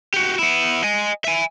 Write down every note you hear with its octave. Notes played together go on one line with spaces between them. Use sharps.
F#4 G4
B3 E4
D#5 G#5
E5 G#5